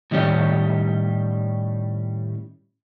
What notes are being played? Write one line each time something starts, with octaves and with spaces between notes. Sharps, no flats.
A2 D#3 G3 C#4 G4